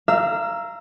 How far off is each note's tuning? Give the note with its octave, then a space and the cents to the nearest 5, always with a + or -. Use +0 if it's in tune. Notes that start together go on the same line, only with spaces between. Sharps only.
F5 -25 A#5 +0 E6 +10